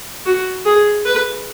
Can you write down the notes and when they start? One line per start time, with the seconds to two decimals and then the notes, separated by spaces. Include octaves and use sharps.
0.26 F#4
0.65 G#4
1.05 B4